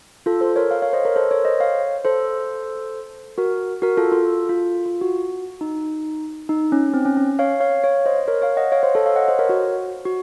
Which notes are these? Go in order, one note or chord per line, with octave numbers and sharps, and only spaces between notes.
F4 A4
A4 C5
A#4 C#5
C#5 F5
C#5 F5
C5 D#5
A#4 C#5
A4 C5
A#4 C#5
C5 D#5
C#5 F5
A4 C5
F#4 A#4
F#4 A#4
F4 A4
F4 A4
F4
F4
F#4
D#4
D#4
C#4
C4
C#4
C#4
C#5 F5
C#5 F5
C#5 F5
C5 D#5
A#4 C#5
C#5 F5
D#5 F#5
C#5 F5
C5 D#5
A4 C5
C#5 F5
D#5 F#5
C5 D#5
A#4 C#5
F#4
F#4